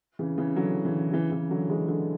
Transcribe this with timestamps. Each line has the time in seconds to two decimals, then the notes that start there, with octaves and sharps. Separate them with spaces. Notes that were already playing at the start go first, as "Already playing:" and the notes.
0.19 C#3 E3
0.38 C#3 E3
0.56 D3 F#3
0.85 C#3 E3
1.12 C#3 E3
1.32 C#3 E3
1.50 D3 F#3
1.69 E3 G#3
1.88 D3 F#3